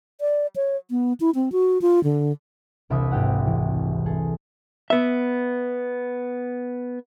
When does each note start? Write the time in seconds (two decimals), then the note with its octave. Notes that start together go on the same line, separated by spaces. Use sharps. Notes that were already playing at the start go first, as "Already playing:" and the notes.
0.21 D5
0.56 C#5
0.90 B3
1.20 E4
1.35 C4
1.52 F#4
1.81 F4
2.04 D3
2.90 E1 C2 E5 B5 D#6
3.11 G#1 G4 F#5
3.47 E3
4.06 G#4 A4
4.90 B3 E5